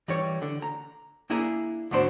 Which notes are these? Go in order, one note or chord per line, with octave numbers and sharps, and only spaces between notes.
E3 G3 C#5
D3
A#5
A#3 D4 E4 G#4 A#5
D2 G#2 F#3 B3 D4 C5